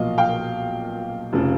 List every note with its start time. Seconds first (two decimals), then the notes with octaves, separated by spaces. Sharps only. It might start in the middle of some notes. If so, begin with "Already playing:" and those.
Already playing: B1 A#2 F3 D#5 F5
0.18 F5 G5
1.33 F1 C#3 F3